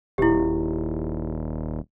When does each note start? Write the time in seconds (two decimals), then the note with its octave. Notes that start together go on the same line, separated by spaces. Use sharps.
0.18 D#1 E4 G4